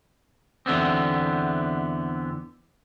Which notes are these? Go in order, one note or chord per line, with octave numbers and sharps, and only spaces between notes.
E2 D3 B3 C4